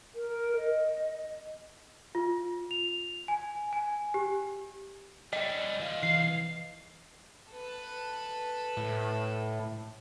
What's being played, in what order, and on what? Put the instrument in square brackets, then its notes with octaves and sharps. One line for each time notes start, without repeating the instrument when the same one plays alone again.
[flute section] A#4
D#5
[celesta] F4
F7
G#5
G#5
G4
[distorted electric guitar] G3 C#4 [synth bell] D#5
[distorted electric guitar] E3 F5
[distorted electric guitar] C2 F5 [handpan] E3 [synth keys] C7
[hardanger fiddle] A4 B4
[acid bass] A2